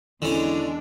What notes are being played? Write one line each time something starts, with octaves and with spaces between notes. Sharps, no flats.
E2 D3 E3 G#3 C#4 D4